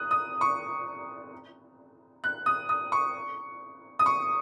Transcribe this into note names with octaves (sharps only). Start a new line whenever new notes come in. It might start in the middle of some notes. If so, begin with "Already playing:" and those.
Already playing: D#6 F#6
D#6
C#6
F#6
D#6
D#6
C#6
D#6
C#6